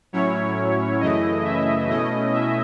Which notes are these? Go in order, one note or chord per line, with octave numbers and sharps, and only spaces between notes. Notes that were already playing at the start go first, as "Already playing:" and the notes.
A2 F#3 C#4 E4 C#5
F#2 C#3 E3 A3 E4 D#5
E5
B2 A3 C#4 E4 D#5
E5